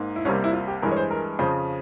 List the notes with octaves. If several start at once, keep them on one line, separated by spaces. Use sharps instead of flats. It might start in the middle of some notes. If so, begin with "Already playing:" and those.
Already playing: G#2 A#3
E4
C2 C3 G3 A#3 C#4
E4
F4
G4
G2 E3 G#3 A#4
C#5
C5
A#4
F2 C#3 F3 C5